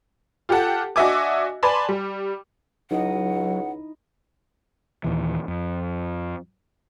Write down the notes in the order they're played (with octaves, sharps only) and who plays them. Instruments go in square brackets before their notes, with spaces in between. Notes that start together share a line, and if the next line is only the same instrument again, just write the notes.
[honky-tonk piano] F4 G4 A4 F#5 A5
D4 F#4 D#5 E5 G#5 D6
B4 D5 G#5 A5 B5 C6
G3
[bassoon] C#2 [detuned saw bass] F#3 [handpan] D#4 E4 D#5 [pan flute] F#5
[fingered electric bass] D#2 A#2 E3
F2